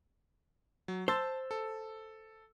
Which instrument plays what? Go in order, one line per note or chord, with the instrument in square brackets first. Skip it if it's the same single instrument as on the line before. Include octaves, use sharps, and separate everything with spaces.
[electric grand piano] F#3
[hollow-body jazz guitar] C5 [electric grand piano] A5 E6 A6
[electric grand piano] A4